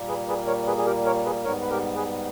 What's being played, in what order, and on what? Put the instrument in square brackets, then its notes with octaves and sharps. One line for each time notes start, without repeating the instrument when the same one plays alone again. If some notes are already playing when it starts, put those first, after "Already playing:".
Already playing: [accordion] A#2 G3 A#3
G#4 B4
G#4 B4
A#4 C#5
G#4 B4
G#4
G4 A#4
A#4 C#5
G#4 B4
G#2 G3 B3 A#4 C#5
B4
G4 A#4
G#4 B4